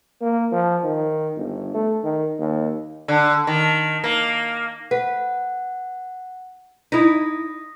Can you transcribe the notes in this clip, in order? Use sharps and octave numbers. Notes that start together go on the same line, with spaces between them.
A#3
F3
D#3
G1
A3
D#3
D#2
D3
D#3
A#3
B4 F#5
D#4 E4 D#6 A#6 B6